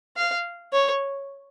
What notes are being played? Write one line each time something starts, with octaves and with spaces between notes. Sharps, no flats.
F5
C#5